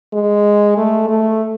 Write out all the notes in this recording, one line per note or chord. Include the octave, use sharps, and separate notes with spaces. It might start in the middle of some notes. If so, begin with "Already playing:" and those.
G#3
A3
A3